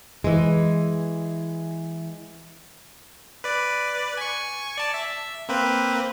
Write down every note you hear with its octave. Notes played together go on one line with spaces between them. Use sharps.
E3 G#3
B4 D5
G#5 C#6
D5 A5
E5
A#3 C4 B4